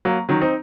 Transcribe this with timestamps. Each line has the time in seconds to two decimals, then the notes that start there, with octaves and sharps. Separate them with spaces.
0.05 F#3 A#3
0.29 D#3 F#3
0.41 C4 D#4